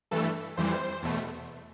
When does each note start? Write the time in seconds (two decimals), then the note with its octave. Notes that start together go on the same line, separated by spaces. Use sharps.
0.11 G2 E3 A3 A4
0.57 F2 E3 G3 C5
1.03 E2 B2 A3